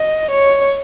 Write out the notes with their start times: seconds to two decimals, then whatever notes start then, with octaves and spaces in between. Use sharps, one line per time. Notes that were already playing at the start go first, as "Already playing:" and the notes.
Already playing: D#5
0.32 C#5